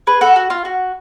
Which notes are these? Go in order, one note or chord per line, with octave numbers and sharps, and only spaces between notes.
G#4 B4
F#4 A4
F#4
F4
F#4